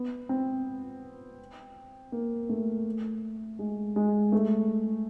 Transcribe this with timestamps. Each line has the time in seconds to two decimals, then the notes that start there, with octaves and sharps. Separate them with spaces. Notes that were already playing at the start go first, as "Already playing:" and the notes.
Already playing: B3
0.29 C4
2.12 A#3
2.49 A3
3.59 G#3
3.96 G#3
4.32 A3